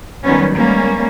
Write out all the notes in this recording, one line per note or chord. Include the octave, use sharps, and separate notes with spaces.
D#3 F#3 G3 B3 C#4
G3 G#3 A#3 B3 C#4